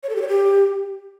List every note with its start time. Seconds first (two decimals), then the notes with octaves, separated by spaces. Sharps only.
0.03 C#5
0.09 A4
0.16 G4
0.22 C#5
0.28 G4